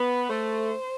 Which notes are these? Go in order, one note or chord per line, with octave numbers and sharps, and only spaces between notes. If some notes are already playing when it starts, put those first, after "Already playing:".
Already playing: B3 B4
A3 C5